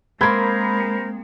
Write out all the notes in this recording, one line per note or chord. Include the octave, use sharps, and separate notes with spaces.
G#3 A#3 C4 A#4 C5 B5 G#6